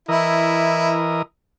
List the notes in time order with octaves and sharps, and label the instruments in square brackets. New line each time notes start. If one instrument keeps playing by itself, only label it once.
[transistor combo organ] E3 A#4 D#5 [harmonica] E4